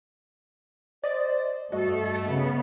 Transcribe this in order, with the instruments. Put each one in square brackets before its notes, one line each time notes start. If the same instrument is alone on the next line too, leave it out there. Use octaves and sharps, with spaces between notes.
[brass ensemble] C5 [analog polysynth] D5 D#5 A6
[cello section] G2 A4 [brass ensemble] A3 [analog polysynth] F#4 D#5
[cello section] C#3 B3